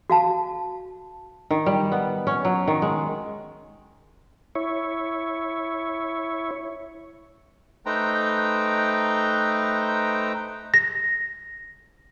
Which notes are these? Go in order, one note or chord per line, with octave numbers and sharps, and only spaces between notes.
F#4 F5 A5
D#3
G3
B3
C#4
F#3
D#3
G#3
E4 C#5
A3 D#4 B4 C5 G5 A#5
A#6